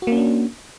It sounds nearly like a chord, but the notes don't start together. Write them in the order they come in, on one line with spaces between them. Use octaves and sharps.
F#4 A#3 C#4 D4